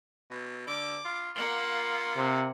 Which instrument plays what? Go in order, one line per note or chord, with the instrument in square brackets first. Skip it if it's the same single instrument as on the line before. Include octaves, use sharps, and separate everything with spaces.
[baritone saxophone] B2
[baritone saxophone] D3 [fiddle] D6
[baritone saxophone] F4
[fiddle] A#3 F#5 [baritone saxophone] F4
[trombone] C3